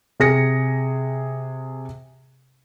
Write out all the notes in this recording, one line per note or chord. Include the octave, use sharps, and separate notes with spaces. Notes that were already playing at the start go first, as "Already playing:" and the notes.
C3 G#4 A#6 C#7